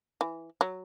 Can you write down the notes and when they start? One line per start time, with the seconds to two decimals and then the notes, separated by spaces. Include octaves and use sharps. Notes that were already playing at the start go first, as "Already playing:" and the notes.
0.21 E3
0.61 F#3